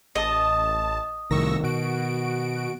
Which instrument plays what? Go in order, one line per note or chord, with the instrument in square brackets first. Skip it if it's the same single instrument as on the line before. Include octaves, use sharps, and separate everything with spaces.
[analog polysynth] A1 A5 [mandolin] D#5
[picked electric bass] C2 A2 [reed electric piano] D#3 A#4 [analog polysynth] C#6 E6 A#6
[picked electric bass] B2 [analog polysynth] F#4 D7